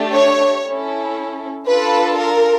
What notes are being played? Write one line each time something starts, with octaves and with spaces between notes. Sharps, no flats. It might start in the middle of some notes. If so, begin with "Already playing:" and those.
Already playing: A3 D4 G4
C#5
C#4 E4 A4
D4 F4 A4 B4
A#4